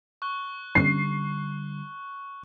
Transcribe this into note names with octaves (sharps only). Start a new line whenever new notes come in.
C#6 F#6 G7
D3 G3 C7